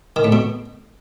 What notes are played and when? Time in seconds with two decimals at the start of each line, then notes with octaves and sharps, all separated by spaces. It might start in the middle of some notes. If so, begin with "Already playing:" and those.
0.16 D#3
0.24 A2
0.32 B2